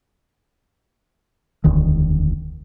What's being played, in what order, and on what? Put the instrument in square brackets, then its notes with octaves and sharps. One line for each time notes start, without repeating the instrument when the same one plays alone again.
[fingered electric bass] E1 D2 D#3